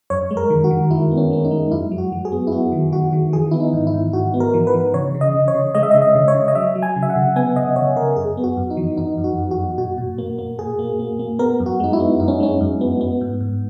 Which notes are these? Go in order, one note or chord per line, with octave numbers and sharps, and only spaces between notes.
F#2 C#5
G#3
A#4
D#3
F#4
D#3
G#3 E4
B3
C#4
G#3 C#4
D#4
G#3
F#2 E4
F#3
F#4
F#3
G#4
B3
E4
B3 F#4
D#3
D#3 F#4
D#3
E3 G#4
B3 E4
D#4
G#2
E4
G#2
G#2 F#4
B3
A#4
E3
B4
E3
C#3 C#5
C#3
D#5
C#3
C#5
C#3
G#3 D#5
E5
D#5
C#3
D#5
C#3
C#5
C#3
D#5
F#3 E5
F#3
G#5
C#3
E5
F#5
C#3
B3 G#5
C#3 D#5
C#3 C#5
C#3 A#4
F#2 G#4
B3
F#4
F#2
D#4
E3
F#2 D#4
F#2
F#4
F#2
F#4
F#2
A#2 F#4
A#2
A#3
A#3
A#2 G#4
A#3
A#3
A#3
B3 A#4
F#2
F#4
G#3 D#4
E4
B3
F#2 D#4
C#4
G#3 C#4
F#2
B3
B3
G#2
G#2